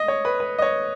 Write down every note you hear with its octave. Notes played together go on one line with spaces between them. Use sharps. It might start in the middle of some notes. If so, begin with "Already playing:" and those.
Already playing: D#5
C#5
B4
B4
D#5
C#5